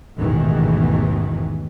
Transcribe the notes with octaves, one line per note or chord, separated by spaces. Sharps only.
A1 E2 G#2 B2 D#3 E3